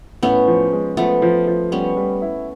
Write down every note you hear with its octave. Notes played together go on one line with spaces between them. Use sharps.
A2 B3 C#4
F3
G#3
F3 A3 B3
F3
F3
G3 B3 C#4
G3
E4